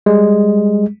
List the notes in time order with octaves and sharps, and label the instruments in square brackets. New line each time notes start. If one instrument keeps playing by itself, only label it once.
[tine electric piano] G3 G#3